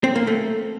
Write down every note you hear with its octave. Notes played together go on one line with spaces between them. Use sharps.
C4
A#3
A3